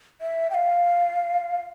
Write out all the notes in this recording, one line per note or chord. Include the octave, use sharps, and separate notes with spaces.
E5
G5
F5